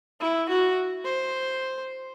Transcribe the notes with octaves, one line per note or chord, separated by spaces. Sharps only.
E4
F#4
C5